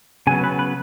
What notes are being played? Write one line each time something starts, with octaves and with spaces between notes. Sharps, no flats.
C#3 F#3 B3 G#5
B4
B4